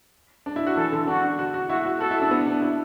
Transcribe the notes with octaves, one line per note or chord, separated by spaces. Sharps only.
D4
E4
F#4
E3 A4
D3
D4 F#4
F#4
F#4
E4 F#4
F#4
F#4 A4
E4
D4
B3
D4
E4